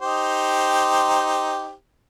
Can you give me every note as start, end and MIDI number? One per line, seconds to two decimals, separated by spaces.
0.01 1.73 63
0.01 1.73 67
0.01 1.73 72